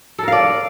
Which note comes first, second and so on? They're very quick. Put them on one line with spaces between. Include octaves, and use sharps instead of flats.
A4 A#4 F5 D5